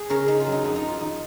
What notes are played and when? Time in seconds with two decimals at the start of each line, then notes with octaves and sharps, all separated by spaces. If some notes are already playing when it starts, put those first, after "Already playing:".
Already playing: G#4
0.10 C#3 A#4 C#5
0.28 C#3 D#4
0.40 F4
0.46 F#3
0.52 D#4
0.64 F2 D#4
0.76 D#4
0.82 F2
0.88 F4
1.00 D#3 D#4